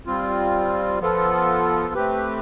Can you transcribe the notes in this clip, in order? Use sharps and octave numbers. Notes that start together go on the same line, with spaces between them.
G3 C4 F4
F3 B3 F4 A4
A3 C4 G4 B4